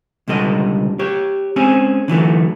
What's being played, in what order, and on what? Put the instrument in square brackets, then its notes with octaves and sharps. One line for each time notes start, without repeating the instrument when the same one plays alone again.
[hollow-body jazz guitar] C#2 B2 D3 G3 A4 D#5
G4 C#5
G#3 C4 C#4 G#4
D3 E3 F#3 A3